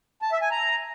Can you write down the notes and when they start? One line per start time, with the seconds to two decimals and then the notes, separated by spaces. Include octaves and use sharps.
0.22 A5
0.32 E5
0.42 G#5
0.51 A#5